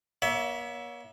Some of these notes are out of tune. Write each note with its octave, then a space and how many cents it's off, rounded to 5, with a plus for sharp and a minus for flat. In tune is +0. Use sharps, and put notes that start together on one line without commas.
A#3 +45 C#5 +35 E5 +0